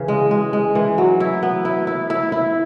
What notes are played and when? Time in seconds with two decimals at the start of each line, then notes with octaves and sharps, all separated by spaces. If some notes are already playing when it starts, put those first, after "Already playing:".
Already playing: C#3 E3
0.08 G#3
0.31 G#3
0.53 G#3
0.75 E3
0.98 F#3
1.20 E4
1.43 B3
1.65 E4
1.87 E4
2.10 E4
2.32 E4